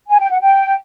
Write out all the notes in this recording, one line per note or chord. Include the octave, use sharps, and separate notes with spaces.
G#5
G5
F#5
G5